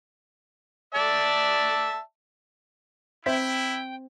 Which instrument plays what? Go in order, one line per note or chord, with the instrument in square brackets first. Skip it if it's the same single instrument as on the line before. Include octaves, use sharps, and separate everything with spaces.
[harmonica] D5 E5 A5
[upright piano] C4 [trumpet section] E4 [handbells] C5 E5 B6 [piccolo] G5